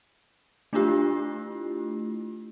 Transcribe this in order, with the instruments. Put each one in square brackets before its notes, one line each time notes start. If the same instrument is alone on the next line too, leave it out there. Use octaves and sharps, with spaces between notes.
[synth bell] A3 D4 E4 F4 G4